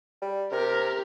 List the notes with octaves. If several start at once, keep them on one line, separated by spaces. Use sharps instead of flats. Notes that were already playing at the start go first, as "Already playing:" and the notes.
G3
C3 G4 A#4